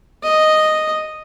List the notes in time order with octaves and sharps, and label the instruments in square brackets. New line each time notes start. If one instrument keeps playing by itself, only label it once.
[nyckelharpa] D#5